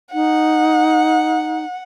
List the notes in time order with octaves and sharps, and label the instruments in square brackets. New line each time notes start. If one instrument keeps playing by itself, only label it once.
[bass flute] D#4 [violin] F#5